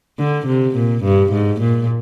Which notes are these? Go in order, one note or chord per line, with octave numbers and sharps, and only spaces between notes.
D3
C3
A#2
G2
G#2
A#2